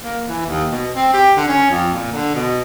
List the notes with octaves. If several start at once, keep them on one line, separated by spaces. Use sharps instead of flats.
A#3
E3
D#2
B2
C4
G4
D3
C#4
F2
A#2
D3
B2